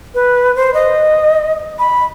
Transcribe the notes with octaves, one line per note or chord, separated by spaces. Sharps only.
B4
C5
D#5
B5